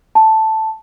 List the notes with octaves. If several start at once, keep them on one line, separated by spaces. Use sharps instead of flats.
A5